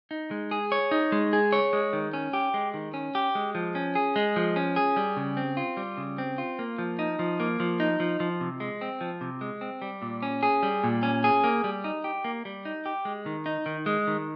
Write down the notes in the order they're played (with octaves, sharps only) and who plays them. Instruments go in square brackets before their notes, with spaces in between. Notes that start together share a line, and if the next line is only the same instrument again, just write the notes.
[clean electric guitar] D#4
G#3
G#4
C#5
D#4
G#3
G#4
C#5
G#3
D#3
C#4
G4
G#3
D#3
C#4
G4
G#3
F3
C#4
G#4
G#3
F3
C#4
G#4
G3
C#3
C4
F4
G3
C#3
C4
F4
A#3
F3
D#4
F3
A#3
F3
D#4
F3
F3
C3
G#3
C4
F3
C3
G#3
C4
G3
A#2
C#4
G#4
G3
A#2
C#4
G#4
A#3
G3
D#4
G4
A#3
G3
D#4
G4
G#3
D#3
D#4
D#3
G#3
D#3